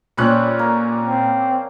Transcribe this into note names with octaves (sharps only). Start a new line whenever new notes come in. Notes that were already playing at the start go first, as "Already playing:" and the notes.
A#2 G3 C4 C#4 F#6
A#3
C4